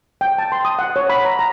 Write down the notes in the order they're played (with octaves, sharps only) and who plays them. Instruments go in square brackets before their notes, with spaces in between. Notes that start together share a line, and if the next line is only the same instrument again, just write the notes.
[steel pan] G5
A5
C6
D#6
F#5
C#5
B5
A#5
A#5